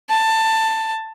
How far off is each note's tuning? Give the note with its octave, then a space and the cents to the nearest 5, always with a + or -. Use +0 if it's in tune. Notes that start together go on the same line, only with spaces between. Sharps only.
A5 +15